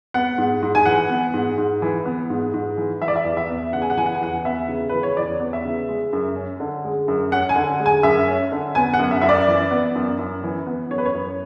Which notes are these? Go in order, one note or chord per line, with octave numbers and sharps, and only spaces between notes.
B3 F#5
G#2
G#2
G#5
E3 F#5
B3
G#2
G#2
E3
B3
G#2
G#2
E3
E3 E5
D5
E5
E2
E5
B3
C#3 F#5
G#5
F#5
E3 G#5
F#5
G#5
E2 F#5
B3 E5
C#3
E3 B4
C#5
E2 D5
B3
E5
C#3
G#3
F#2
C#4
D3
G#3
F#2
C#4 F#5
G#5
D3
G#3
G#5
F#2 E5
C#4
D3
B3 G#5
F#5
F#2
E5
F#2 E5
D5
E3
B3
F#2
F#2
E3
B3
F#2 C#5
B4
C#5
F#2